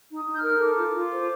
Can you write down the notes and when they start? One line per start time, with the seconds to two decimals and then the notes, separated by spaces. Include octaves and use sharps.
0.09 D#4
0.15 D#6
0.26 D#4
0.33 G6
0.38 F6
0.43 A#4
0.60 A4 D6
0.78 F4
0.95 F4
1.12 C5